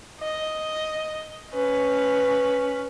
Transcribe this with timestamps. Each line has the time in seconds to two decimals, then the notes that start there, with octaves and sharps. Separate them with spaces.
0.20 D#5
1.54 C#4 B4